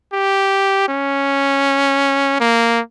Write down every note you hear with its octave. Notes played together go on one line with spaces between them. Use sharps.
G4
C#4
A#3